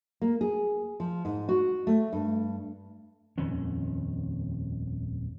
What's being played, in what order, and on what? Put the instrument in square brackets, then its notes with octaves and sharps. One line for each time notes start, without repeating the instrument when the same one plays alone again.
[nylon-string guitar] A#3
G#4
F3
G#2
F#4
A3
G2
[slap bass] D#1 F2 D#3 C#4